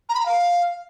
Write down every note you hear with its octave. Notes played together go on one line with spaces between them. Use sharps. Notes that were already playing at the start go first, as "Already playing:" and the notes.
A#5
B5
A#5
F5